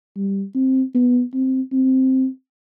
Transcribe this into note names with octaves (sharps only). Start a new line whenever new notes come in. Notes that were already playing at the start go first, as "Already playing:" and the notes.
G3
C4
B3
C4
C4